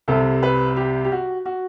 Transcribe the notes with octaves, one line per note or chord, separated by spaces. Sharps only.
C2 C3 G3 A4
B4
G4
G4
F#4
F#4